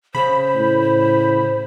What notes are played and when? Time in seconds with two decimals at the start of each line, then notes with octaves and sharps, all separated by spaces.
0.15 C#3 C5 B5
0.56 A2